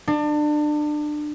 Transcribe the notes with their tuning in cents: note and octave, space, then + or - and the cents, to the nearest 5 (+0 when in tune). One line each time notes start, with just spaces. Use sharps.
D4 +30